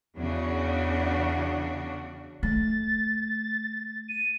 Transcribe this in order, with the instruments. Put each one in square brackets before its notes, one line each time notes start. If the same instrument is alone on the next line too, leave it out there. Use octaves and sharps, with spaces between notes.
[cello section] E2 C#3 D4 F#4
[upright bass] A3 [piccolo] A6
[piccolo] D#7